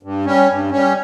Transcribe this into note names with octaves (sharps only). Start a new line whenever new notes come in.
G2
G3 C#4
G2
G3 C#4